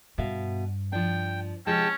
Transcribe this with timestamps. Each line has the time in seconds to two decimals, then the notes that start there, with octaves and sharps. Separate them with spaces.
0.18 G2 B2 E5 F5
0.92 F3 D4 G5
1.67 C3 F3 G#3 C#4 G5 A5